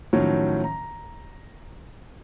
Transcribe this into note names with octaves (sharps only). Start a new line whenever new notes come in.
A2 D#3 F3 F#3 C#4
A#5